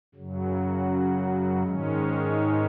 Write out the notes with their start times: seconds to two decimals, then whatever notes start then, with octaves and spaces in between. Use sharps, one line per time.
0.14 F#2 C#3 F#3
1.63 G#2 D#3 G#3 C#4